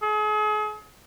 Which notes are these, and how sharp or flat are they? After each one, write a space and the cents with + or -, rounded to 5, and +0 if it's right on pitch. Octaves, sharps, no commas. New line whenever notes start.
G#4 +40